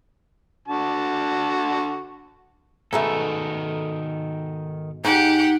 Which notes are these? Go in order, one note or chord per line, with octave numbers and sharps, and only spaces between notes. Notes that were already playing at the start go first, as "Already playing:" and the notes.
D3 F#4 A5
G#2 B2 D#3 A3 A4
G#2 D#4 G4 F#5